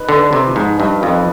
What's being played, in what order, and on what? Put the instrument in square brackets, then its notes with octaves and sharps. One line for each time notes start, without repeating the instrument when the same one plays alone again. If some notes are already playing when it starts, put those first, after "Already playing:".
Already playing: [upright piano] D#4 B4
[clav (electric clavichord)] D3
[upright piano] B4
[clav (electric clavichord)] C3
[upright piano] F3
[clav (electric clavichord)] G#2
[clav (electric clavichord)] G2 [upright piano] D#4
[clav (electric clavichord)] F2
[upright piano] B4